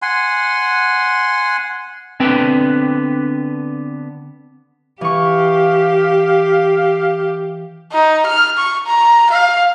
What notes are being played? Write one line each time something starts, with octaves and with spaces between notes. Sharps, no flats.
F#5 G#5 C6
D3 B3 C4 D4 B4 G5
E3 G4 F5 C#6
D#4
F6
C#6
A#5
F5